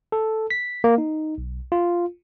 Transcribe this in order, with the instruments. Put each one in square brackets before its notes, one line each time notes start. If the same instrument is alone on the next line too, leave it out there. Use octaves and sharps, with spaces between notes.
[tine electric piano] A4
B6
A#3
D#4
B1
F4